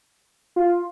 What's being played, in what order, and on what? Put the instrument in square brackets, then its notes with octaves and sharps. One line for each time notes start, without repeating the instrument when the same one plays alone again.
[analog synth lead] F4